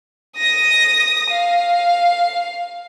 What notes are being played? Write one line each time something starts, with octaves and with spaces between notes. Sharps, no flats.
D#6 A#6
F5